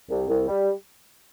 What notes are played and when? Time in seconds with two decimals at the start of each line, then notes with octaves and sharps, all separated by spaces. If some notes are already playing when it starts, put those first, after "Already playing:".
0.09 C2
0.28 C2
0.48 G3